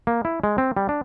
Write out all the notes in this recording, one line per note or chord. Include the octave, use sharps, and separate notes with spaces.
A#3
E4
G#3
C4
G3
D4